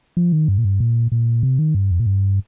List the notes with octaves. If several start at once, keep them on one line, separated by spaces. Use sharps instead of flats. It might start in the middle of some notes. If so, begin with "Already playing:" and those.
F3
D#3
G2
A#2
G2
A#2
A#2
C3
D#3
G2
F2
A#2
G2